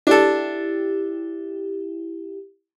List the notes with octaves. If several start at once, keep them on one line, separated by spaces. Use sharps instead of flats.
D4 E4 G4 A4